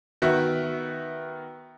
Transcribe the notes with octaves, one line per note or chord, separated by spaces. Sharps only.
D#3 B3 F#4 E5